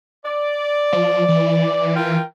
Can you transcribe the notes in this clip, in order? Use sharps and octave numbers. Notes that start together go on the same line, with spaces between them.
D5
F3
E3
F4 A#4 G5